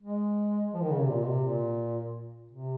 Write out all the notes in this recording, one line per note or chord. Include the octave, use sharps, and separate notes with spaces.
G#3
F3
D#3
C#3
C3
A#2
C3
A#2
C3